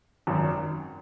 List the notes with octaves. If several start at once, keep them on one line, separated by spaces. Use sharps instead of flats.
G#1 F#2 D#3